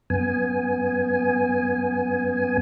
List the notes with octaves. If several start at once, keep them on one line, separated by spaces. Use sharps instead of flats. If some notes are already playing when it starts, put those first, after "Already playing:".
F#2 B3 G#5